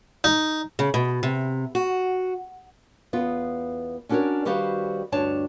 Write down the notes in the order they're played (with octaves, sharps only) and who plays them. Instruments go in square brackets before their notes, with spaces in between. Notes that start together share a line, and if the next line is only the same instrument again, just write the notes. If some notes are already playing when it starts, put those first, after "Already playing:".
[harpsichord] D#4
[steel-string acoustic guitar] C#3
B2
C3
F#4
[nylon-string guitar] E2 B3 F4
C#4 D4 F#4 A4 A#4 C#5
D#3 G3 F#4 B4 C5 F5
D2 G2 D4 C#5 A5